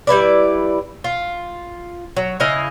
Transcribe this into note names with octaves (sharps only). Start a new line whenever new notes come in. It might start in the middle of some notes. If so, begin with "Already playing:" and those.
G3 E4 B4 D5
F4
F#3
C#3 E4 D#5 F5